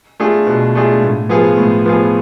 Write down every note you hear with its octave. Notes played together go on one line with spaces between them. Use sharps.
A3 D4 F4 G#4
B2
A3 D4 F4 G#4
A2
F3 B3 F4 G#4
A2
F3 B3 F4 G#4